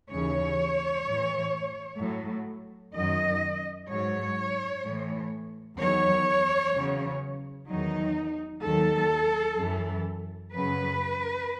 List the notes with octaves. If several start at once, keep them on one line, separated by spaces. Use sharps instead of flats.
D#2 C#3 E3 C#5
A2 E3
A2 F#3
F#2 D#3 F#3 D#5
G#2 F#3 C#5
A2 E3
E2 D#3 F#3 C#5
E2 C#3 F#3
E2 D#3 F#3 D#4
D#2 D#3 F#3 A4
F#2 E3
F#2 C#3 F#3 B4